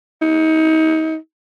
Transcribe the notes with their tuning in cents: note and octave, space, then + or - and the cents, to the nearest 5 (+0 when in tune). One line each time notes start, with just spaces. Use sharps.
D#4 +35